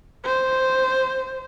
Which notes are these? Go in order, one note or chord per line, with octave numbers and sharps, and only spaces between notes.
C5